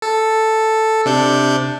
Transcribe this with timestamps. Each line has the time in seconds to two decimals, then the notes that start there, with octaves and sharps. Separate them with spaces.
0.02 A4
1.06 C3 D4 G6